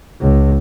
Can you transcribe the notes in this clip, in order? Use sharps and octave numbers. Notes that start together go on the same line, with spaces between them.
C#2